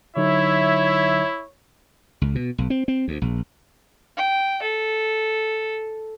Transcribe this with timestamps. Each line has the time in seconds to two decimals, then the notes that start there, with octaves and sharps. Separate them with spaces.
0.17 D3 F#3 D#4 E4 C#5 E5
2.21 C#2
2.35 B2
2.58 B1
2.70 C4
2.88 C4
3.08 D2
3.22 A#1
4.17 G5
4.62 A4